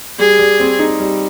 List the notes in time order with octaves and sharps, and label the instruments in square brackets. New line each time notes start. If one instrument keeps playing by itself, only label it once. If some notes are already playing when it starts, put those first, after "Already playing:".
[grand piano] G3 [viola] G#4
[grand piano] G3
C4
D#4
G3